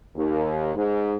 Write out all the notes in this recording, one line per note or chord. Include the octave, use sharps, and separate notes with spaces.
D#2
G#2